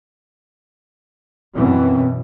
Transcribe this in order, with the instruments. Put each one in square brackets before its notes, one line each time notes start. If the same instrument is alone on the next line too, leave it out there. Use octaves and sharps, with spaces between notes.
[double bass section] F#2 B2 E3 [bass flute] C4